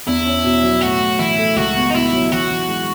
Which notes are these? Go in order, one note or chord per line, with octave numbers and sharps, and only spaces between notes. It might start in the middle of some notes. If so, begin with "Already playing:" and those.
E2 E4
C#4
B2
F#3
A2 F#4
A2
E3 E4
A3
C#2 F#4
B3
D#4
B2 E4
F#3
E3 F#4
E3
G#3